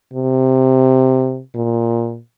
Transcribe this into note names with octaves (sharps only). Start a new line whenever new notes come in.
C3
A#2